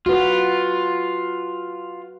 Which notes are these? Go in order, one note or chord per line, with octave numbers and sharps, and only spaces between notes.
F4 F#4 B4